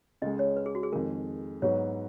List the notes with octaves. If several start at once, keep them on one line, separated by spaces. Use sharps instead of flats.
C#2 C#3 G#3 D#5
C#5
B4
G#4
F#4
G#4
F2 D#3 G#3 A#4
G#2 F#3 B3 F#4 C#5